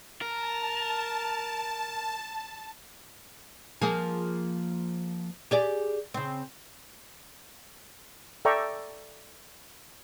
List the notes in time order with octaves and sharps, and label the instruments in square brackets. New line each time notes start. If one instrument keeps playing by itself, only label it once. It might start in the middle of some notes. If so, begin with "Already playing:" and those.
[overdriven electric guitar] A#4 [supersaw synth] A5
[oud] F3 A#3 G#4
G4 G#4 D5
C#3 C4
[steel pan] A4 D5 E5 G5 A#5 C#6